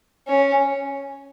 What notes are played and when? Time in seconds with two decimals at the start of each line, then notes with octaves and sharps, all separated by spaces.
0.27 C#4